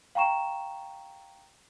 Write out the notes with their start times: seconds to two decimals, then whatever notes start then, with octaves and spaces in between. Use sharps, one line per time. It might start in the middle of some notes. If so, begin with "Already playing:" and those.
0.15 F5 G5 A#5 C#6 E7